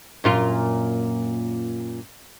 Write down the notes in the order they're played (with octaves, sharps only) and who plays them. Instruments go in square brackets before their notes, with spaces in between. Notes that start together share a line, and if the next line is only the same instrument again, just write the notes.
[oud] F#2 A#2 F4